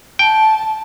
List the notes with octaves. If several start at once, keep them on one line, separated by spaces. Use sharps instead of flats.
G5 A5